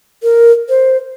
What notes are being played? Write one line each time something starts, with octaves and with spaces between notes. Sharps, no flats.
A#4
C5